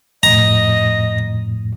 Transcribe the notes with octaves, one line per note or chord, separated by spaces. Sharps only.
F2 A2 D#5 A#5